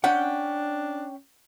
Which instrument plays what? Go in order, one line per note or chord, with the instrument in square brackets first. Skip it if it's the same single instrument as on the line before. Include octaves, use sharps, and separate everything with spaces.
[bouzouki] C#4 G5 [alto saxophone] D4 [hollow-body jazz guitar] F#5